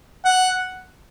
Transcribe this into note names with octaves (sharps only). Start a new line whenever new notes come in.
F#5